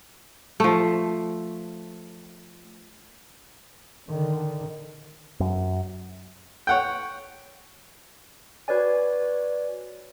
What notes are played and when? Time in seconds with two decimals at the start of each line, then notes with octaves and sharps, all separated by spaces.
0.60 F3 A3
4.09 D3 D#3
5.40 F#2
6.67 C#5 F#5 G5
8.68 F#4 B4 C#5 D5 G#5